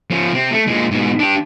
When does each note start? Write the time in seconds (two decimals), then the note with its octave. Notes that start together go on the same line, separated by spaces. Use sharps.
0.11 F3 C#4
0.34 C3 C4
0.53 A3
0.67 A#2 G#3
0.91 G#2 B2
1.19 D4 G4